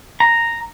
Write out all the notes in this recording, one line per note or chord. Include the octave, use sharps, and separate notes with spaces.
A#5